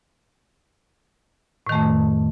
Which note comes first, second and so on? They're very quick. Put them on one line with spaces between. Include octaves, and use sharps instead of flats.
A2 D#3 A3 F2